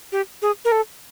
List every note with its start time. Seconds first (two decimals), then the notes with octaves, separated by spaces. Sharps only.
0.12 G4
0.42 G#4
0.65 A#4
0.72 A4